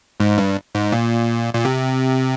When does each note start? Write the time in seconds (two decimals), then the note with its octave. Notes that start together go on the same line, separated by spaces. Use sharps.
0.20 G#2
0.38 G2
0.75 G#2
0.92 A#2
1.54 A#2
1.65 C3